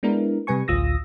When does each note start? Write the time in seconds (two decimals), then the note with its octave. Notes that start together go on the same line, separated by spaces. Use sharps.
0.03 G#3 B3 D4 E4 A#4
0.47 C3 G3 B4 G#5 C#6
0.68 A1 D2 F4 D#6 E6 A#6